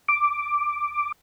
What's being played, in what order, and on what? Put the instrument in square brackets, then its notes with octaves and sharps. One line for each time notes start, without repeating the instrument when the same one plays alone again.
[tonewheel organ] D6